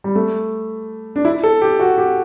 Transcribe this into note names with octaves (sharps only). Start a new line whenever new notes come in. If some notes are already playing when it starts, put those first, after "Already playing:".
G3
A3
D4
E4
A4
G4
F#4
G4